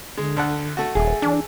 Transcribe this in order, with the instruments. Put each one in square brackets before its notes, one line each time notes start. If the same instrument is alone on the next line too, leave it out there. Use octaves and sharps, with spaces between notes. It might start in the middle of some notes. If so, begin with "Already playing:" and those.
[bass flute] D3 [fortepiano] G#3
[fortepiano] D2 A4 F#5
A3 F#4
[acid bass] D#1 [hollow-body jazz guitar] G#4 [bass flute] E5
[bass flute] E3 [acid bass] D4